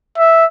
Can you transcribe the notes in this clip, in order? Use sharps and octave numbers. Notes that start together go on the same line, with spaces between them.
E5